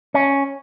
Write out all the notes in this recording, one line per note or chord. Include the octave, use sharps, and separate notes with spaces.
C#4